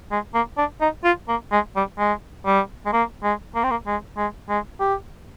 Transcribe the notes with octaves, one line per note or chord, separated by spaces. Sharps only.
G#3
A#3
D4
D#4
F4
A#3
G#3
G3
G#3
G3
G#3
A#3
G#3
A#3
C4
A#3
G#3
G#3
G#3
G4